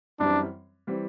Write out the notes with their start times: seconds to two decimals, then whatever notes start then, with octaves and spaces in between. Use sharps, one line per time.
0.20 F#2 E3 G3 C4 D4
0.87 E3 G3 C4